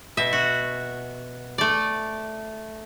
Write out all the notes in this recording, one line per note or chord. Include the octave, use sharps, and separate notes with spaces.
B2 E5
F#4
A3 D5